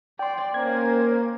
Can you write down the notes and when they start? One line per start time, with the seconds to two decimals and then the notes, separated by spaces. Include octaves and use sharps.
0.19 D5 G5 C6
0.54 A#3 C#4 C5 G#6